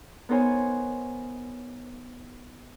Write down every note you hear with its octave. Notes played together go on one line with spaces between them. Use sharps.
B3 D#4 A#4 C5 C#5 G#5